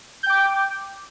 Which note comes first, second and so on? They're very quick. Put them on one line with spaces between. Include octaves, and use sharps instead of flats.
G6 G5 D6